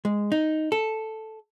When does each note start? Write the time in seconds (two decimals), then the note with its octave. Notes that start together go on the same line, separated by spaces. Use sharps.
0.05 G#3
0.32 D#4
0.72 A4